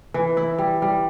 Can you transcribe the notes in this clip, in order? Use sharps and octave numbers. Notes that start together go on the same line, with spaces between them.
E3
E4
G3
G3